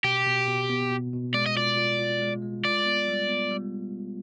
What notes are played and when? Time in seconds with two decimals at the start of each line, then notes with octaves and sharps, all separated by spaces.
0.04 B2 G4
0.26 B2
0.48 B2
0.70 B3
0.91 B2
1.13 B2
1.34 G#3 D5
1.46 D#5
1.56 F4 D5
1.77 F4
1.99 F4
2.22 G#3
2.42 G#3
2.65 F4 D5
2.86 B3
3.08 G3
3.29 B3
3.51 G3